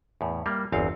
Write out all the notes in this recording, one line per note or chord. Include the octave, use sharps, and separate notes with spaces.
E2 A2
G3 A#3
G1 E2 C4 F5